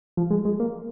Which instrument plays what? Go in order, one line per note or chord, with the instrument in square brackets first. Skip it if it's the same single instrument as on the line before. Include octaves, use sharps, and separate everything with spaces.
[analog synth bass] F3
G#3
G#3
A#3